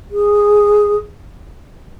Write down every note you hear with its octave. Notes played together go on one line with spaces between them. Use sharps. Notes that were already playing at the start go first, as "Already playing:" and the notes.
G#4